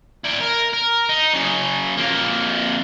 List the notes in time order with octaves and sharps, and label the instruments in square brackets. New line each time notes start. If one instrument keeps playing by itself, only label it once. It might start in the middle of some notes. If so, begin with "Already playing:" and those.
[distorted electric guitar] E4 D5
A#4
A#4
D#4
C#3 F#3
F2 A#3